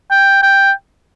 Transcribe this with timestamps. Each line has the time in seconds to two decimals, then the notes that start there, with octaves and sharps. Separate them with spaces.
0.11 G5
0.43 G5